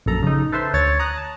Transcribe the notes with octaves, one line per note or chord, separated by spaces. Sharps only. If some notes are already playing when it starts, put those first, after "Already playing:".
A#1 F#2 A4 A#5
C#3 D#4
A4 B4 C5 E5 A5 C6
D2 C#5 A6
A#5 D#6 F#6
A5